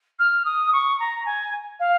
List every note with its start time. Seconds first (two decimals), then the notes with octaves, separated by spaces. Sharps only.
0.19 F6
0.45 D#6
0.73 C#6
1.00 A#5
1.26 G#5
1.80 F5